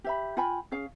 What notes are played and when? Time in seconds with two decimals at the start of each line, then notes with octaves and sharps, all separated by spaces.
0.04 G4 E5 B5
0.37 F4 G5 G#5 B5
0.72 C#4 G#4 F5